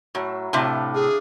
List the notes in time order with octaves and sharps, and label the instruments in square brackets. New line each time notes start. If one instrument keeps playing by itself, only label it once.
[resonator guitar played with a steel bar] A2 [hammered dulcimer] F#3
[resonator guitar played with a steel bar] A2 C3 [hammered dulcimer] D4 E4 F5
[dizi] G#4 [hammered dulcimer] F5